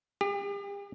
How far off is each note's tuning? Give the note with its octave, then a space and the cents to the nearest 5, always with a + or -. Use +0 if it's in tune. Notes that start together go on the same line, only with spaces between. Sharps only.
G4 +40